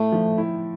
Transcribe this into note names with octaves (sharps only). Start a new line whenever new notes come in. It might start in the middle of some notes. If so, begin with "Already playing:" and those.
Already playing: A2 A3
F3
E4